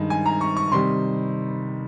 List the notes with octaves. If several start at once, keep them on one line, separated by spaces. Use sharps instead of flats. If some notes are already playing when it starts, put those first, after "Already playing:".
Already playing: G2 D#3 G#3
G#5
A#5
C#6
C#6
C3 D#3 G3 C6